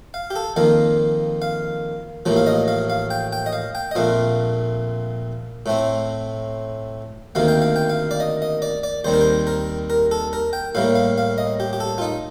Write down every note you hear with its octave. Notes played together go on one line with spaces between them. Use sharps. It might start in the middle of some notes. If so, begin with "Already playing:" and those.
F5
G4
A4
F2 D#3 A#3 F5
F5
A1 A2 F3 A#3
F5
D#5
F5
F5
G5
G5
D#5
F5
G5
D#5
A#1 A#2 A3 C4 F5
A2 A3 C4
D2 C3 D#3 A#3 F5
G5
F5
G5
F5
D5
D#5
D#5
D5
D5
D#2 D#3 G3 C4 C5
A#4
C5
A#4
A#4
A4
A#4
G5
A2 G3 A#3 F5
F5
F5
D#5
G4
G4
A4
F4
D#4